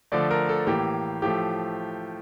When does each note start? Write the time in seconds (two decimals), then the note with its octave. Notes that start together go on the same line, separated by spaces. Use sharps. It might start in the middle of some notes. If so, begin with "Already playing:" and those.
0.12 D3 F3 A3 D5
0.30 A#4
0.49 A4
0.67 A2 E3 A#3 G4
1.22 A2 F3 A3 G4